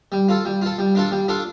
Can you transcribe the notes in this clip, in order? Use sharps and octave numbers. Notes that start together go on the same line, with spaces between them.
G3
F4 A4
G3
F4 A4
G3
D4 F4 A4
G3
D4 F4 A4